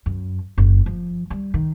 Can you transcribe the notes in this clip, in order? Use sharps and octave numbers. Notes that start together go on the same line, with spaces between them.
F#2
F#1
F3
G3
D#3